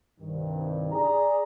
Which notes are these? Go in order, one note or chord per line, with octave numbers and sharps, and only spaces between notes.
C2 G2 D#3
G#4 D5 A#5